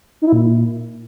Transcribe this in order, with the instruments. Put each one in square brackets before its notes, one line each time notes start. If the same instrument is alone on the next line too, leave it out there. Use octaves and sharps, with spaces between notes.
[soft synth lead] D#4
E4
A#2